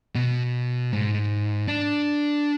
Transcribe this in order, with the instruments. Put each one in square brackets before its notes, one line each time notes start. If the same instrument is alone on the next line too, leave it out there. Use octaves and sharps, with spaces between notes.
[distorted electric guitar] B2
G#2
D4